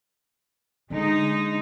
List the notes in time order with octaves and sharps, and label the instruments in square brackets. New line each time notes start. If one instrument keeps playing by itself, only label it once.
[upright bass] D3 D4 [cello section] G#3 D#4